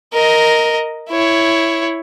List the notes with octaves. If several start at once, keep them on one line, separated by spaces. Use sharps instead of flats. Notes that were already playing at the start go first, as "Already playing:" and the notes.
A#4 D#5
E4 C#5